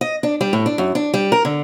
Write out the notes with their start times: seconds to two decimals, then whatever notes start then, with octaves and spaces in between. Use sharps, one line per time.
0.01 D#5
0.23 D4
0.41 G3
0.53 A2
0.66 D4
0.78 F#2
0.95 D4
1.14 G3
1.32 A#4
1.45 D3